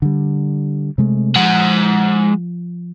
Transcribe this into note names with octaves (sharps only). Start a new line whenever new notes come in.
D3 G3
C3 G#3 A3
F3 G#3 F#5